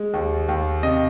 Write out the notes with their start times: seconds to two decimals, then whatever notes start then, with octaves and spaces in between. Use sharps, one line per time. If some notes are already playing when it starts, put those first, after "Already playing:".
Already playing: G#3
0.14 D#2
0.49 D#2
0.83 C3 D#5